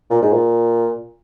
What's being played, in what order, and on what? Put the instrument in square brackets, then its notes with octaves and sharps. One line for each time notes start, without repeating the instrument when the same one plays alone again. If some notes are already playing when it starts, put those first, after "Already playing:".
[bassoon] A#2
G#2
A#2